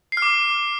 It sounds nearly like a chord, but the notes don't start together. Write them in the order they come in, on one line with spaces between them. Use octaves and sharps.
C7 F6 D6